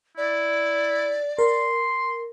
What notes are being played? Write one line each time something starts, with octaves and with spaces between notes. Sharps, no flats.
E4 D5
A#4 C6